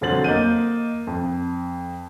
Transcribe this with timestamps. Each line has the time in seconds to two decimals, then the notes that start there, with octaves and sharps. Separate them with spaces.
0.01 F2 D3 F#3 C5 A6 F#7
0.24 A#3 D#5 G6 D#7
1.07 F2